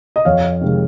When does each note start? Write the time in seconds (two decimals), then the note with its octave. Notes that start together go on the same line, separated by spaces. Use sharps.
0.16 D#5
0.25 F2 C#5 F5
0.61 C3 D#3 G#3